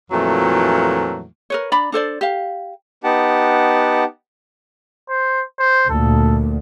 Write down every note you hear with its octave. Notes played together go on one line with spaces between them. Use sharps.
F2 A#2 E3 F#3 A3
A#4 B4 C#5
D4 D5 A#5 B5
D4 A4 C5 D5
G4 F5
B3 D#4 G4 F#5 A5
C5
C5
D2 A#2 A4